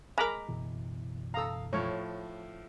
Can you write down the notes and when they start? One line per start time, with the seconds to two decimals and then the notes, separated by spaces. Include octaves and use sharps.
0.18 G#3 A#4 A#5 B5 D6
0.49 F#1 B2 E3
1.34 A4 F5 A#5 D#6 E6
1.73 A2 F3 C#5